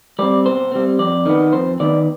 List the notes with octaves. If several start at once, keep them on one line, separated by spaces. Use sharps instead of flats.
G3 C4 D5
B2 C5
G3 C4
F2 D5
D#3 B3
F2 C5
D#3 B3 D5